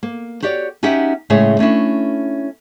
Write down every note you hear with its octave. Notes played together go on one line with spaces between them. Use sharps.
A#3
F#4 G4 C#5 D5
C#4 D#4 F#4 G4 E5 F#5
A2 C#3 G#3 G#4 C#5 E5
A3 C#4 D4 E4